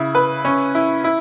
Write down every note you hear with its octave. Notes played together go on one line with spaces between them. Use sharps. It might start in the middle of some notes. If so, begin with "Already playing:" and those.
Already playing: C#3 E4
B4
C#4
E4
E4